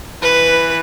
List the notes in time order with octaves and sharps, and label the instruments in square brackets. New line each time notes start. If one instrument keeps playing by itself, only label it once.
[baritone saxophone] E3 [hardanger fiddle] B4